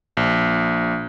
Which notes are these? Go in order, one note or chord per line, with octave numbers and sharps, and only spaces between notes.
A#1